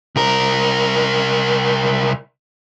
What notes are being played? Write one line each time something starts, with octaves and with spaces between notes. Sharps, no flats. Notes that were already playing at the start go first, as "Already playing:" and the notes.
C2 A#4